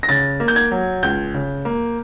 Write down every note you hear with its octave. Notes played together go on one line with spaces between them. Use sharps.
A#6
C#3 A6
A#3
G6
G#6
F#3
C#2 G6
C#3
A#3